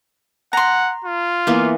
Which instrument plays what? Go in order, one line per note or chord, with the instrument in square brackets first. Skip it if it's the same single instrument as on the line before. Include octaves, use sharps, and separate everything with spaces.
[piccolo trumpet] F#5 [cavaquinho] A#5 C6
[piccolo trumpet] F4
[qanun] E3 A#3 B3